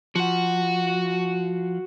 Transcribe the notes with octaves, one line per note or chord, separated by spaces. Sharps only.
F3 F#4 F#5